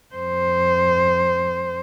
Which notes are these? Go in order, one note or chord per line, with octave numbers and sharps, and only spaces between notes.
F2 C5